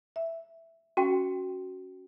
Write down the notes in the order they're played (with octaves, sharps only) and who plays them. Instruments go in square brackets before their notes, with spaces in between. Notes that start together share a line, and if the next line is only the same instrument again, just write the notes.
[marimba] E5
[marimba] C#4 [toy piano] F#4 G5